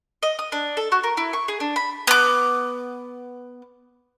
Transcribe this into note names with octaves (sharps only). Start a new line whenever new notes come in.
D#5
D#6
D4
A4
F#4
A#4
E4
C#6
G#4
D4
B5
B3 D6